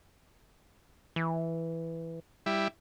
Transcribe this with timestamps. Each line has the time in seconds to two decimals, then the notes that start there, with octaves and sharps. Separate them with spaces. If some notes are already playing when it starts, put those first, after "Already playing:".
1.16 E3
2.46 G3 E4